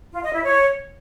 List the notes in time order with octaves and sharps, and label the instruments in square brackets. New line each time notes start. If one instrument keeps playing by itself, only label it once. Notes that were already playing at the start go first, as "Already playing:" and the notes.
[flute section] F4
D#5
E4
C#5